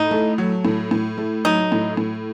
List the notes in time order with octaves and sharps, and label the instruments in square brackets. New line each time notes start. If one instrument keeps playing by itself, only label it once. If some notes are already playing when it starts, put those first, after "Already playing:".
Already playing: [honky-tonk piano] A2 [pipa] D#4
[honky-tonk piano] A3
F#3
A2
A2
A3
[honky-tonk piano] F#3 [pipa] D#4
[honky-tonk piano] A2
A2